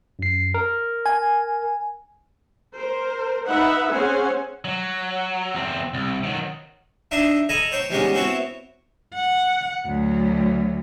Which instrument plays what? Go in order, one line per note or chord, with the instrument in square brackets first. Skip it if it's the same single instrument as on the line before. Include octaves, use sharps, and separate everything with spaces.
[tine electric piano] F#2 C7
A#4
[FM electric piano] G#5
[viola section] A#4 C5
D#4 B4 E5 F#5 B5
C4 C#4 G#4 C5 F#5 G#5
[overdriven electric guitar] F#3
E2 C4
C2
D#3 F#3
[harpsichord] D4 D#4 E5 C6
A4 D#5 G#5 A#5 B5
C5 C#5 G5
E3 G3 G#3 B3 C#4 D#4
B3 C4 E4 F#4 C#5
[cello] F#5
D2 F#3